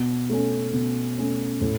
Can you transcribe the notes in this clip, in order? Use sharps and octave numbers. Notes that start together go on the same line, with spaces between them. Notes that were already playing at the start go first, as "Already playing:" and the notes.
Already playing: B2
A3 C#4
B2
A3 C#4
A2